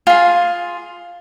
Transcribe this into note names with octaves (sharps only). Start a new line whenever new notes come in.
F4 G#4